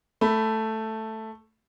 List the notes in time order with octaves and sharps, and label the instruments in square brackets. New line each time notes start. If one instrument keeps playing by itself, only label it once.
[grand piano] A3 B5